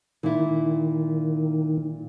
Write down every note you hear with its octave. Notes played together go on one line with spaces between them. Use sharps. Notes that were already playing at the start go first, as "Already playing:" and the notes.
A#2 D#3 E4